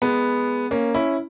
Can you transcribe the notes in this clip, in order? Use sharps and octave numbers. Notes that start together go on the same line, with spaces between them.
G#3 B3
A#3 C#4
C#4 E4